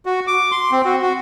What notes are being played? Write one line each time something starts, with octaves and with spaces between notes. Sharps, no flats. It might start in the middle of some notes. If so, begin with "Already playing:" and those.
F#4
D6
C6
C4
F#4
F#4